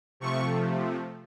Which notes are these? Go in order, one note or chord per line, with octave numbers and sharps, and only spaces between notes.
C3 F3 A3 C#6